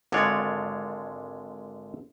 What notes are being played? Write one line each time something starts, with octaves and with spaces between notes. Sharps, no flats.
G#1 D3 G#3 F4 C#5 D5